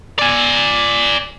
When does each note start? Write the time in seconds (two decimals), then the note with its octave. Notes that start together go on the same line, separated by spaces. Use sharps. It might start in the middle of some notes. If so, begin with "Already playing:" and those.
0.19 D5 G#5